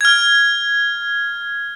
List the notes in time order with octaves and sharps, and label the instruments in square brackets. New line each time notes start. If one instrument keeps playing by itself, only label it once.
[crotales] F6 G#6